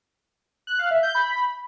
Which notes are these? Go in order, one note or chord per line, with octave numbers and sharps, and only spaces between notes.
F#6
F5
E5
G6
B5